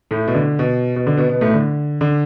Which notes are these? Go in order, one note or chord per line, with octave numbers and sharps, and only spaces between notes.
A2 A3
B2
D3
B2
B2
D3
B2 B3
B2 B3
A2 A3
D3
D3